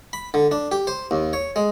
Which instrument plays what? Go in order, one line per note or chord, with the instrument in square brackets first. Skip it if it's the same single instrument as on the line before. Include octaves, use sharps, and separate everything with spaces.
[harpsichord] B5
D3
D4
G4
C5
D#2
C#5
G#3